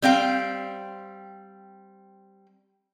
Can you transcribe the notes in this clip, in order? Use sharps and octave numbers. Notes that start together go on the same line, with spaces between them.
G3 C4 F5 G5